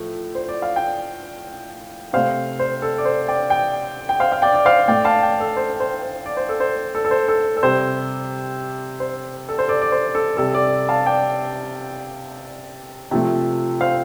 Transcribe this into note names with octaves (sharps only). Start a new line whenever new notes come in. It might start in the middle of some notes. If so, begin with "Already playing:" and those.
Already playing: A2 F3 A3
C5
D5
F5
D5 G5
C3 A3 C5 F5
C5
A4
D5
C5
D5 G5
D5 G5
G5
C5 F5
F5
D5 G5
D5
C5 F5
A2 A3 D5 G5
F5 A5
D5 G5
A4
C5
C5
C5
D5
C5
A4
C5
A4
A4
C5
A4
A4
C3 G3 C5
C5
A4
C5
A4 D5
D5
C5
A4
C3 G3 A4
A4 D5
F5 A5
D5 G5
C3 F3 A3
C5 F5